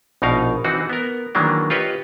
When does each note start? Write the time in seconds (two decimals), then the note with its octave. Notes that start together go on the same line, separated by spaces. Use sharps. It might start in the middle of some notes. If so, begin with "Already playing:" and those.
0.22 A#1 B2 D#4 A#4 F5
0.65 E3 C4 D#4 F#4
0.89 B3 A#4
1.35 D#3 E3 F#3 G#3 A#3 D4
1.70 F4 G4 B4 C#5 D#5